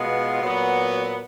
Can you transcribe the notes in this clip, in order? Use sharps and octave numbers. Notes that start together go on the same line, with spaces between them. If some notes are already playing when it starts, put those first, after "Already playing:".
Already playing: B2 G#3 B3 F4
A#2 F#3 B3